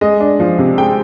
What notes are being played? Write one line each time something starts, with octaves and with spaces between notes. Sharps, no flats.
G#3 D#5
D4
F3
C3
G#3 G5